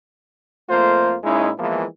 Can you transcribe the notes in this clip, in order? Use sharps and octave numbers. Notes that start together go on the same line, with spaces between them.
F2 A3 A#3 F4 C5
A#2 G#3 C#4 D#4 E4
E3 F3 G#3 A#3 B3 E4